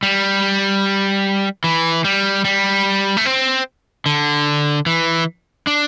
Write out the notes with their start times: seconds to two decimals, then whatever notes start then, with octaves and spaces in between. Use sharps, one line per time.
0.03 G3
1.64 E3
2.04 G3
2.45 G3
3.17 A3
3.25 C4
4.06 D3
4.86 E3
5.67 D4